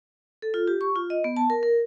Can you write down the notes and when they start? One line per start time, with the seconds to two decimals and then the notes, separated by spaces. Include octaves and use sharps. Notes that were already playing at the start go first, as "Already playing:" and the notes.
0.42 A4
0.54 F4
0.68 G4
0.81 C#6
0.96 F4
1.10 D#5
1.24 B3
1.37 A5
1.50 A#4
1.63 A#4